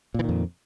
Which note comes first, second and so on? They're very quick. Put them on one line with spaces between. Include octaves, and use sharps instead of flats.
A#2 E3 D#3 F2